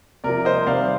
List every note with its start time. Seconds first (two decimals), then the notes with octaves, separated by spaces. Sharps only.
0.24 C3 A#4 D5
0.29 F3
0.45 C5 D#5
0.67 C3 D#3 G3 D5 F5